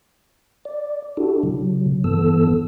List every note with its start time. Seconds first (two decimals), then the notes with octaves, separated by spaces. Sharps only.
0.65 D5
1.17 D4 E4 F#4 G4 A4
1.43 C#3 F#3
2.04 G2 E3 B3 A4 E6